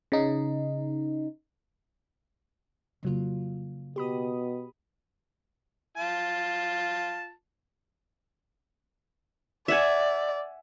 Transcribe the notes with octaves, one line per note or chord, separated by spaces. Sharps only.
C#3 D#4
F2 C#3 F#3 A#3 F4
B2 G4 B5 D#6
F4 A5
D5 E5 F#5 G#5